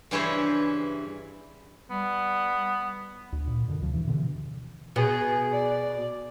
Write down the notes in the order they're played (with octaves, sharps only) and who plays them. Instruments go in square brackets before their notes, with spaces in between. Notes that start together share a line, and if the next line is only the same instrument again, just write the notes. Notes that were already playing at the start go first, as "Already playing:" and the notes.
[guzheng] G2 C#3 E3 E4 C5 C#5
[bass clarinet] G3 [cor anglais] B3
[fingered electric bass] D2
A#2
F#2 B2 D3
D2 C3 F3
E3
B2 D3 E3
[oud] B2 [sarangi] G#4
[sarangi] D5